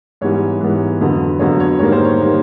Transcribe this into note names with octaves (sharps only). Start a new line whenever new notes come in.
G#2 E3 G3 B3 C#5
G#2 E3 G3 B3
F2 D3 F#3 B3
F2 D3 F#3 B3 C#5
C#5
G#2 D#3 G3 A#3 C#5
C5
C#5
D#3 G3 A#3